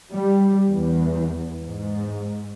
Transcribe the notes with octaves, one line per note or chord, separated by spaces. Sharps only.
G3
E2
G#2